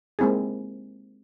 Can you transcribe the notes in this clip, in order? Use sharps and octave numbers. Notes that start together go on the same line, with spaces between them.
G#3 A#3 C4 E4 G#4